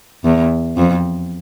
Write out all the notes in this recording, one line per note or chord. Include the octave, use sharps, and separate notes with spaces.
E2
F2